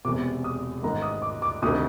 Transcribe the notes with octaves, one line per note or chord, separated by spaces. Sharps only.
E1 E2 C3 D6
D#6
A1 G#2 D#3 A#5
D#6
D6
D6
D2 C3 D#3 D#6